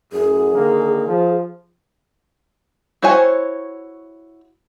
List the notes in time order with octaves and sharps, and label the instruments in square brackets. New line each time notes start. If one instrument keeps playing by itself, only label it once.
[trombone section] F#2 A2 [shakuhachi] G#4
[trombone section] D3 D#3 A#3
F3
[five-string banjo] E4 F#4 C5 C#5 G#5